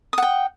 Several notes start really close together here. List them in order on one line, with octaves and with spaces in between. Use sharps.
D#6 F#5 G5